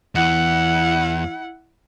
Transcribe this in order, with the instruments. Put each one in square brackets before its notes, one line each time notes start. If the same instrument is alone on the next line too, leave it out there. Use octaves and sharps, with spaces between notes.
[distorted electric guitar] E2 [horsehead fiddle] E4 F#5